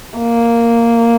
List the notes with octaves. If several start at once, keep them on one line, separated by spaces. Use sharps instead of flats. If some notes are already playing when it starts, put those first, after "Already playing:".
A#3